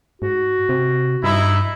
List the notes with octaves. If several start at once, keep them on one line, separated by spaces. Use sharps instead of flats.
G#2 F#4
C3
G2 D#4 E4